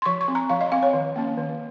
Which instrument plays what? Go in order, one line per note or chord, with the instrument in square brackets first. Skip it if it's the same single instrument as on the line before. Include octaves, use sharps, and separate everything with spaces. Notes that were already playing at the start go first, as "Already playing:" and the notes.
[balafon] C6
F3 C#6
C#6
C4
A#5
F3 F5
D#5
C4 F5
C#5
D#3
A#3 C#4
D#3